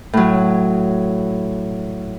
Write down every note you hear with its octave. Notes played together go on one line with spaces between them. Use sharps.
A2 F#3